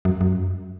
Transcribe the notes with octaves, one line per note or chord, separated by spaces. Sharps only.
F#2
F#2